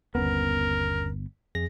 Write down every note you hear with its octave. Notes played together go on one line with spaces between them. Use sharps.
G1 D#2 B3 C#4 A#4
F2 G#4 A#6